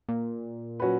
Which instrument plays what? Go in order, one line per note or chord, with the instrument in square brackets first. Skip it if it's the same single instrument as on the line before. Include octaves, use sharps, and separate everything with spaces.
[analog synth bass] A#2
[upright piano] F#3 C#4 F#4 B4